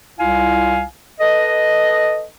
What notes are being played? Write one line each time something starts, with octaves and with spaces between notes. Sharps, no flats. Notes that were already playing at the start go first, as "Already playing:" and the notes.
C2 E4 F4 F5 G#5
A4 B4 D#5